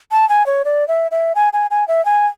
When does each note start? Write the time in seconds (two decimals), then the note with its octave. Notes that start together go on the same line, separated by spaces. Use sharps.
0.12 A5
0.29 G#5
0.46 C#5
0.65 D5
0.88 E5
1.11 E5
1.35 G#5
1.53 G#5
1.71 G#5
1.88 E5
2.05 G#5